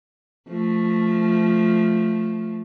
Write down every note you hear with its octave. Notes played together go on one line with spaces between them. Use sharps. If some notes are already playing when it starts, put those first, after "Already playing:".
F3 A3